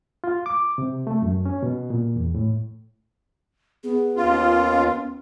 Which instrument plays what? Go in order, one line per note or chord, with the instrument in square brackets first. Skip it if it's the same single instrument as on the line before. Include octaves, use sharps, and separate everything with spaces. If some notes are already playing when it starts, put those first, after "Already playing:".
[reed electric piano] F4
D6
C3
A3
F#2
C#4
B2
A#2
E2
A2
[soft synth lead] B3 [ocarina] G#4
[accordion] D#2 F4 [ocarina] C#4
[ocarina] C#4